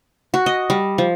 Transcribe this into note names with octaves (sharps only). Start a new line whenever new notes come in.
F#4
D#5
G3
F3